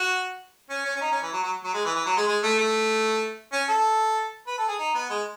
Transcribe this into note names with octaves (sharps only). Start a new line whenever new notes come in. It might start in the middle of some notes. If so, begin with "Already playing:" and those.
Already playing: F#4
C#4
C#4
C#4
D#4
C#4
E3
F#3
F#3
F#3
G#3
E3
E3
F#3
G#3
G#3
A3
A3
C#4
A4
B4
A4
G#4
D#4
B3
G#3